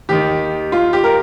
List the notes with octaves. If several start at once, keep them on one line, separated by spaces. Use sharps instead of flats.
D#2 D#3 G4
F4
G4
A#4